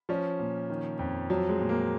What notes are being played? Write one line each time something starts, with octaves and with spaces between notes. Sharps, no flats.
F3 C#4
A#2
D#3
F2
F3 F#3
G#3
A#2
A#3